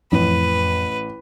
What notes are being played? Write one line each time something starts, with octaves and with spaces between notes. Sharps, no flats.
A1 F2 B4